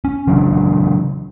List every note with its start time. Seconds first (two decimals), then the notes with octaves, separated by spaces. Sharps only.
0.05 C#4
0.27 C#3 E3 F#3 D4